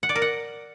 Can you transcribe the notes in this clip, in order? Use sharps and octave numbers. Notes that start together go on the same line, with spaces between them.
F#5
D5
A#4
F#5